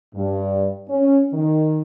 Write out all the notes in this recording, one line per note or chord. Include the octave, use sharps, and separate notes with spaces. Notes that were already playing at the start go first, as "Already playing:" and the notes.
G2
C#4
D#3